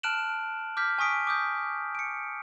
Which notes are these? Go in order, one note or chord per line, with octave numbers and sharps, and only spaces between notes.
A5 F6 F#6 D7 E7 F#7
D6 F6 G6 B6
G#5 C#6 D#6 B6 D7
D6 D#6 G6
C#7 D7